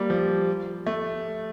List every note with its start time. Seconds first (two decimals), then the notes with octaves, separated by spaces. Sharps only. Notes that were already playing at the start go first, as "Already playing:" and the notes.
Already playing: G3 A#3
0.10 F3
0.87 A3